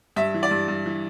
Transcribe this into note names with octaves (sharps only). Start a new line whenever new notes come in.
G2 E5
E3
D5
G2
G2
E3